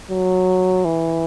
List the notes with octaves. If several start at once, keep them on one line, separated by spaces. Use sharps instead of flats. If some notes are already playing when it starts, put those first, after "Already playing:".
F#3
E3